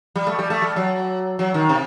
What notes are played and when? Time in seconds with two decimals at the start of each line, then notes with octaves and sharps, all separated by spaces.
0.16 G3
0.27 A3
0.39 G3
0.50 A3
0.62 G3
0.76 F#3
1.39 F#3
1.54 D#3
1.69 C3